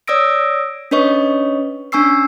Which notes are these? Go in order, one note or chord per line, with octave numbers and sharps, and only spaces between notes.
C#5 D5 D#6 E6 A#6 D7
C#4 D4 B4 C#5 D#5 C#6
C#4 D4 G#5 C#6 E6 C7